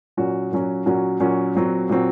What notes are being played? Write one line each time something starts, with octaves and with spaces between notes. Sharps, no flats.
A#2 F#3 C#4 F#4
A#2 F#3 C#4 F#4
A#2 F#3 C#4 F#4
A#2 F#3 C#4 F#4
A#2 F#3 C4 F#4
A#2 F#3 C4 F#4